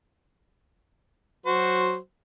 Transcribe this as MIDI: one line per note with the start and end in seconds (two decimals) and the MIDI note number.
1.46 1.96 54
1.46 1.96 66
1.46 1.96 72